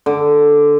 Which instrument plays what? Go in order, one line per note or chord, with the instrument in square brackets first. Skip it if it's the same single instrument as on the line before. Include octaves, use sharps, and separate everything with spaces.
[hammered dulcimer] D3